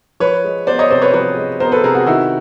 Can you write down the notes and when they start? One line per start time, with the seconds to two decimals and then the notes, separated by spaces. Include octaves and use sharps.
0.20 F3 B4 C#5
0.44 G#3
0.67 B3 C5 D5
0.79 C#5 D#5
0.90 C3 C5 D5
1.02 B4 C#5
1.14 F3 B4 C#5
1.37 G#3
1.60 B3 A#4 C5
1.72 A4 B4
1.84 C3 G#4 A#4
1.95 F#4 G#4
2.07 D#3 E4 F#4